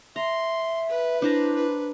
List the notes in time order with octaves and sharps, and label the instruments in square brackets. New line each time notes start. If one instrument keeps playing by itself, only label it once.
[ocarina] E5 [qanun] A#5 [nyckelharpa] C6
[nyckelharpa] B4
[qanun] D4 C5 A#5 [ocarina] E4
[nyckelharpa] B4